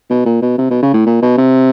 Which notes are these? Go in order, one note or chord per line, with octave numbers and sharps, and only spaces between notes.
B2
A#2
B2
C3
B2
C#3
A2
A#2
B2
C3